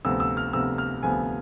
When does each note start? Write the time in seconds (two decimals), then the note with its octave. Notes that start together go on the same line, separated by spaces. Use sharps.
0.04 D2 C3 F3 B3 E6
0.20 E6
0.37 F6
0.53 D2 C3 F3 B3 E6
0.78 F6
1.03 D2 C3 F3 B3 G#5